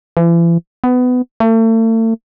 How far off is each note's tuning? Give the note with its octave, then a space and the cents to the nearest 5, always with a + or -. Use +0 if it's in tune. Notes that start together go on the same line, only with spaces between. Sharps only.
E3 +40
B3 +20
A3 +40